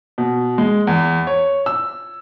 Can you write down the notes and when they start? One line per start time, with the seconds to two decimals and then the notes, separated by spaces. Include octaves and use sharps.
0.18 B2
0.58 G#3
0.87 E2
1.27 C#5
1.66 E6